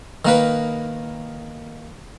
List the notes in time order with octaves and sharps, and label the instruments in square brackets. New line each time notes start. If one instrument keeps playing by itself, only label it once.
[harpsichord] D#3 A#3 B4